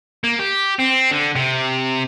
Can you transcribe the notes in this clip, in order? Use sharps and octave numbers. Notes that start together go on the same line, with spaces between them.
A#3
G4
C4
D3
C3